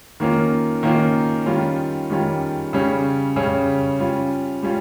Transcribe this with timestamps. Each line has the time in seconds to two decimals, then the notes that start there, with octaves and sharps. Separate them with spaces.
0.20 D#3 A#3 C#4 F4
0.83 D#3 A#3 C#4 F4
1.46 D#3 G3 C#4 F4
2.10 D#3 G3 C#4 F4
2.73 C#3 G3 C#4
3.36 C#3 G3 C#4
4.00 G3 C#4 F4
4.63 G3 C#4 F4